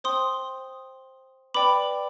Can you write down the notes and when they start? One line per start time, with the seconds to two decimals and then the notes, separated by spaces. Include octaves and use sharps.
0.04 C5 G5 C6 D#6
1.54 B4 D5 G5 B5 D6